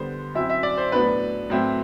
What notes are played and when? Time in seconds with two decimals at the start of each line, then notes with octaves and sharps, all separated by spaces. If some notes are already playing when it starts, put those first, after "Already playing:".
Already playing: D3 G3 B3 C5
0.34 F#2 F#3 C4 E4 E5
0.50 E5
0.63 D5
0.78 C5
0.92 A2 F#3 B3 D4 B4
1.50 A2 F#3 C4 E4